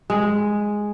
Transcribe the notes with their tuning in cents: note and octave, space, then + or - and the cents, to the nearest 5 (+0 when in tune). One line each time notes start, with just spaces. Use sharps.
G#3 +0 B4 +30